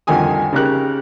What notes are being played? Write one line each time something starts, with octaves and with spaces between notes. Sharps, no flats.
C2 F2 D3 D#3 G#5 D#6
C#3 D#4 G4 A#4 F#6